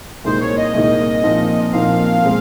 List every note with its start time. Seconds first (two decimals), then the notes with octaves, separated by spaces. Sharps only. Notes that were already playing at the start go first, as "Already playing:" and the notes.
0.24 C2 A#2 G#3 D#4 A#4 C5
0.41 C#5
0.57 D#5
0.74 C2 A#2 G#3 D#4 A#4
1.23 A#2 F3 C4 D#4 A#4
1.73 A#2 F3 C4 D#4 A#4 F5
2.23 A#2 G#3 C4